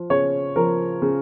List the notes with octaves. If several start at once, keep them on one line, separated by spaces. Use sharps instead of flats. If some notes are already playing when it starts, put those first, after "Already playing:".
Already playing: F3
C#3 C#5
F3 A#4
C#3